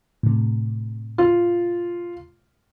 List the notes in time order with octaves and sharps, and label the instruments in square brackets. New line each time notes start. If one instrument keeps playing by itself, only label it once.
[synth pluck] A2 C3
[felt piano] F4